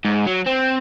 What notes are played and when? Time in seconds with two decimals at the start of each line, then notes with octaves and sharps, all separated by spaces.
0.05 G#2
0.26 F#3
0.46 C4